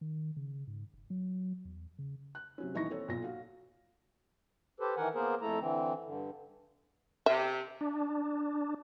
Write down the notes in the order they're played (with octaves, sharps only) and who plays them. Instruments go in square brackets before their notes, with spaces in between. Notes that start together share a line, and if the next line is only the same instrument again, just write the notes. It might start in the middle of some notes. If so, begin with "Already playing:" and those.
[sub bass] D#3
C#3
G#2
F#1
F#3
E2
C#3
[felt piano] F#6
C3 F#3 C#4
D#1 E3 D#4 E4 C#6 A#6
C4 A4 C#5
B1 A#2 F4 A#6
F#4 F5
[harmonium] G4 A4 B4 C5
D#3 E3 A#4 F#5 G#5
A#3 B3 G#4 A#4 C5
F2 A3 E4 A4 A#5
D3 E3 C4
G2 D3
[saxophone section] C3 [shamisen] E5
[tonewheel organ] D4